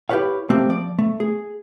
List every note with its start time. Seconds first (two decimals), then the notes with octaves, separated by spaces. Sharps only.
0.09 E4 G4 A4 B4 C#5 F5
0.50 A3 A#3 C4 G4 E5
0.69 F3 D5
0.99 A3
1.20 G#4